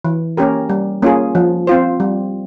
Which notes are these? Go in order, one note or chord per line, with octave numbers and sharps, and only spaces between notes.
E3
A#3 C#4 G4 A#4
G3
A#3 C#4 F4 G#4
F3
C4 F4 C5
G3